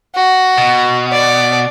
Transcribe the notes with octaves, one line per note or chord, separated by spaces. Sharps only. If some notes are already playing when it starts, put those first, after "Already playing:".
F#4
B2
D5